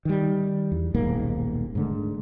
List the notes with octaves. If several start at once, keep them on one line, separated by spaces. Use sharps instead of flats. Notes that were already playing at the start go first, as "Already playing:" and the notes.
D#3 G3
E2
D#1 B1 G#2 A#3
G#2 D3 A3